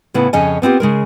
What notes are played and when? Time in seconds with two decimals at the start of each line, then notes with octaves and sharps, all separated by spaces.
0.14 A2 C#3 B3 E4
0.33 F2 C#3 C#4 D#5 G#5
0.62 B3 C4 F4 G4
0.80 C#3 G#3 A#4